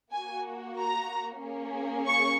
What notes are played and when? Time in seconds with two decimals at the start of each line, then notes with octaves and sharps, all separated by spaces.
0.13 A#3 F#4 G#5
0.77 A#5
1.42 A#3 C#4 G#4
2.07 C#6